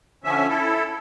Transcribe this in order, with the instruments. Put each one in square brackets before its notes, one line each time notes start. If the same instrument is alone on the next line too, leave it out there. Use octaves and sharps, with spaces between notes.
[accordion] D3 F3 C#4 E5
E4 A4